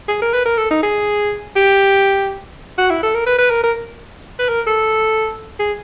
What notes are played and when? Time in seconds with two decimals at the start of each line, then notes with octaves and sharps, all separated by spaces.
0.08 G#4
0.22 A#4
0.34 B4
0.46 A#4
0.57 A4
0.71 D#4
0.83 G#4
1.56 G4
2.78 F#4
2.90 E4
3.03 A4
3.14 A#4
3.27 B4
3.39 B4
3.50 A#4
3.63 A#4
4.39 B4
4.48 A#4
4.67 A4
5.59 G#4